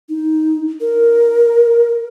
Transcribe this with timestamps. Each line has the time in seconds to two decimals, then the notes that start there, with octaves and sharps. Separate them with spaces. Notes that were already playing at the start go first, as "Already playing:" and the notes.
0.09 D#4
0.81 A#4